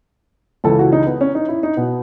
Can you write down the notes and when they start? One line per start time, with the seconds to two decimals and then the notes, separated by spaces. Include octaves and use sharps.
0.64 C#2 C#3 E3 A4
0.79 F#4
0.92 D#4
1.06 B3
1.21 C#4
1.35 D#4
1.48 E4
1.63 D#4
1.77 B2 B3